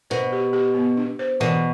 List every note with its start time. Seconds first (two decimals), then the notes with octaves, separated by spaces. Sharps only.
0.10 B2 C5
0.32 G4
0.53 G4
0.75 B3
0.97 D4
1.19 C5
1.40 B2 E3